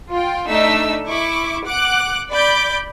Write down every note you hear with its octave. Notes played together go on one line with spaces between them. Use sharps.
F4 G5
A3 D4 D#4 E6 B6
E4 C#6 D6
F#5 D6 F#6
D5 B5 D6 G6